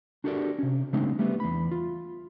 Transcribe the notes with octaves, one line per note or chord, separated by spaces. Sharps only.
D4 F#4 G4 A4 A#4 D5
C3 C#4
C#3 G#3 A3 C4 D4 D#4
G3 A3 B3
E2 B5
F4